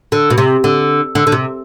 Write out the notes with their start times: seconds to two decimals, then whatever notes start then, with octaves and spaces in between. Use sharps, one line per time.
0.12 D3
0.30 B2
0.38 C3
0.64 D3
1.15 D3
1.27 D3
1.32 C3